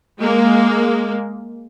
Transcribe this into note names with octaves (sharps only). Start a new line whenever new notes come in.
G#3 A#3